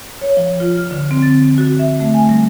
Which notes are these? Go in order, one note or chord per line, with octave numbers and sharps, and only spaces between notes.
C#5
F3
F4
F6
D3
C4
A6
F#4
E5
A3
G#5
G3